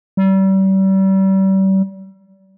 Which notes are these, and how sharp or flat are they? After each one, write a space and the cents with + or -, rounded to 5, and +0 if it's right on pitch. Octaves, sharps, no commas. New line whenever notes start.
G3 -35